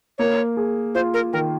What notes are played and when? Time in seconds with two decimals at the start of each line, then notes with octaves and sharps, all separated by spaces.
0.18 A#3 C#5
0.57 G#4
0.95 F4 C5
1.14 A#4
1.33 D#3 A#4